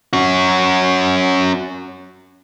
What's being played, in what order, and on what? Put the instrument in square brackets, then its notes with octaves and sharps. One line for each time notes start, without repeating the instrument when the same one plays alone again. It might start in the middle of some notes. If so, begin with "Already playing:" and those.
[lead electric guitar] C#4 F#4